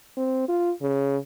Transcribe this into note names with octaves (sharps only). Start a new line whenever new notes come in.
C4
F4
C#3